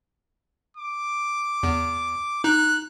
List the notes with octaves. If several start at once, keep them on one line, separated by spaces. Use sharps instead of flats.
D6
E2
D#4 F#6